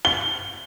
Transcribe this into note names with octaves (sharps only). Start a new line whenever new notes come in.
G7